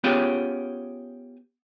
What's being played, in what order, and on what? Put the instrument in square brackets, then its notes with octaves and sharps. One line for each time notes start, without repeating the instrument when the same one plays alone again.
[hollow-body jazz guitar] B3 C#4 F4 G4 G#4 C#5